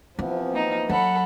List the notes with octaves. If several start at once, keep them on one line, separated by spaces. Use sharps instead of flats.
C3 E3 F3 B3 C4
A#3 D#4
F#3 A4 F#5 B5